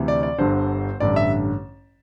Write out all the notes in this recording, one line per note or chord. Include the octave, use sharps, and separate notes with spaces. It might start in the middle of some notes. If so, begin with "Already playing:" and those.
Already playing: D2 C3 E3
D5
D5
G1 G2 D3 C5
A1 G2 D3 D5
E5